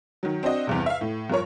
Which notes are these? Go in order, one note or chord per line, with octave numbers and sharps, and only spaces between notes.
D#3 F#3
C4 D4 F#4 D#5
E2 G2 C3
E5 F5
A2
G2 F3 A#4 C#5